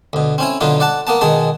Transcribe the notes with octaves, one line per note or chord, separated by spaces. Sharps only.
D2 B2
C4 C#4 E4
B2 D3 F#3 B3 F4
D5 F#5 A5
A#3 B3 A5
B2 D#3 G#3 G#4 A5